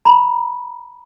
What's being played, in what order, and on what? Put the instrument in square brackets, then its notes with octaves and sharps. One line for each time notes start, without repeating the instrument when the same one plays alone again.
[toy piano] A#5 B5